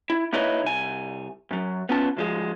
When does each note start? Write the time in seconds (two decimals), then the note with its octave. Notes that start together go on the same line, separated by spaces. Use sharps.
0.10 E4
0.33 A#3 D#4 E4 B4 C#5 D#5
0.64 C2 G#5
1.51 F#2 F#3
1.89 B3 C#4 F4 A5
2.17 D2 F3 G#3